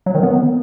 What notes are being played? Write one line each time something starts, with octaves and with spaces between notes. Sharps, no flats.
F#3
D#3
B3